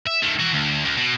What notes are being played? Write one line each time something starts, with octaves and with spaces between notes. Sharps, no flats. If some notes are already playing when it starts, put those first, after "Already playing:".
E5
D#3 A3
E3 F#4
D2
C#2
B2